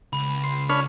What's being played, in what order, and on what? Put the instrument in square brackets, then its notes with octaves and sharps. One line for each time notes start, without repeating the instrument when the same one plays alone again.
[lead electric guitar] C#2 [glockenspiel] B5
[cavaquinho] C6
[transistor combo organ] D4 B5 F6 [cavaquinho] C#5